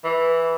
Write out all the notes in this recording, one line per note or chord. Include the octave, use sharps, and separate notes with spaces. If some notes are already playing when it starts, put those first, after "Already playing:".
E3